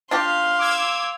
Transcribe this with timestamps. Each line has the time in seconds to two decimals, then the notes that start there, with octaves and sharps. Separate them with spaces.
0.11 D4 F4 G4 F5 C6 F6
0.59 D6 E6 G#6